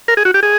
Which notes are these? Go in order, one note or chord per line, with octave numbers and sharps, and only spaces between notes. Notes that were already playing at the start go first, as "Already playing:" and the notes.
A#4
G#4
F#4
G4
G#4